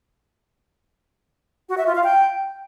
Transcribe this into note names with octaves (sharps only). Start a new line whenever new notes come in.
F#4
E5
F4
F5
G5